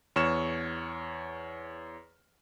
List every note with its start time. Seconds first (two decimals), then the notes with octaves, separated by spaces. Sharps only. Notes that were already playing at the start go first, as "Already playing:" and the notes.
0.16 E2 C#5 C#6 F6 E7